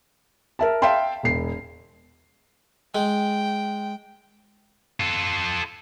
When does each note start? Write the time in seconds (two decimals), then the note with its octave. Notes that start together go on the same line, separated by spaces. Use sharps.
0.59 A#4 E5 A5
0.82 E5 F5 G5 A5 C6
1.23 E1 C7
2.95 G#3 G5
5.00 F4 A4